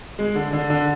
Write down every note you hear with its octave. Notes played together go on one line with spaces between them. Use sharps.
G#3
D3
D3
D3